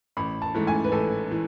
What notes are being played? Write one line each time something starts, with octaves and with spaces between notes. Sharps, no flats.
A1 B5
A5
G#2 E3 A3
G#5
B4
A1 A4
E3